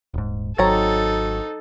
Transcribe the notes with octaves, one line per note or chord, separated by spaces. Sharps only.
D#1 G#2
G#1 F#3 C4 D#4 A4 C#5 A#5 A6